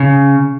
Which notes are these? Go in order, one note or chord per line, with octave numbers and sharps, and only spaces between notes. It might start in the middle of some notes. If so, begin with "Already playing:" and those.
Already playing: C#3